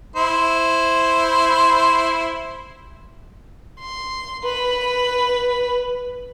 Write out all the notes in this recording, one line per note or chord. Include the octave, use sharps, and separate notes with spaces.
E4 C5
C6
B4 B5